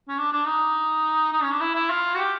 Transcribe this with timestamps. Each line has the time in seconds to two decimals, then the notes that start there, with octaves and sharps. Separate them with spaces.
0.08 C#4
0.18 D4
0.33 D4
0.46 D#4
1.33 D#4
1.42 C#4
1.52 D4
1.61 E4
1.75 E4
1.90 F4
2.15 F#4
2.18 G4